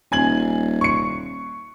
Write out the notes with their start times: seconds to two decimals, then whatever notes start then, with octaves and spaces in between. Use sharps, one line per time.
0.12 D#1 G#5 G#6 F#7
0.81 C#6 C#7